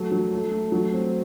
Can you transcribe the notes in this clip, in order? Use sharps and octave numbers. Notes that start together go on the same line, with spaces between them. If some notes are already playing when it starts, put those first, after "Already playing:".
Already playing: F#3 A3
F#3
A3
A3
F#3
C4